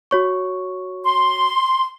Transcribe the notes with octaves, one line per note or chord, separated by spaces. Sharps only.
F#4 C#5 C#6
C6